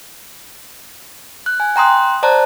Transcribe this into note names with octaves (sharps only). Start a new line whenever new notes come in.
F#6
G#5
G5 A#5 C6 D#6 F#6
C5 D5 A5 A#5 F#6